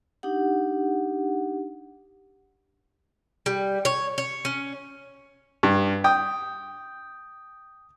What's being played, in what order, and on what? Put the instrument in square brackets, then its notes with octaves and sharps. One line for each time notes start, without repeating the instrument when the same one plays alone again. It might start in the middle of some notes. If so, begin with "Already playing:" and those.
[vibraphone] D4 D#4 G4 F#5
[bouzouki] G3
C#5
C#5
C#4
[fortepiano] G2
G5 D#6